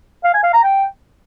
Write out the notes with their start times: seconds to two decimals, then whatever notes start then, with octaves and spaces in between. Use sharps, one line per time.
0.24 F5
0.34 G#5
0.43 F5
0.53 A#5
0.63 G5